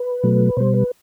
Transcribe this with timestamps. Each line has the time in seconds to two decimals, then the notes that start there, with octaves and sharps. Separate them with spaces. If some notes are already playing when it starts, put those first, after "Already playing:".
Already playing: B4
0.23 B2 F#3 A3
0.57 B2 G3 C5
0.74 B4